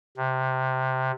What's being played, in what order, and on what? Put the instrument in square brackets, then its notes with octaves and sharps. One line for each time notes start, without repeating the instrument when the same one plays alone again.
[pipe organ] C3